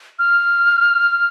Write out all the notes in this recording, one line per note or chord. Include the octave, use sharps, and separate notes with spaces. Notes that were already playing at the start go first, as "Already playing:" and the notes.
F6